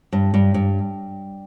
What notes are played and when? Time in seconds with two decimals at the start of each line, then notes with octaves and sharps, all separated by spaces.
0.13 G2
0.34 G2 G3
0.54 G2